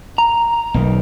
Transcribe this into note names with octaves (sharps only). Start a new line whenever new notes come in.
A#5
B1 D#3